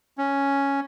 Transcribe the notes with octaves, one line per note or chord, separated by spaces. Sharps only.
C#4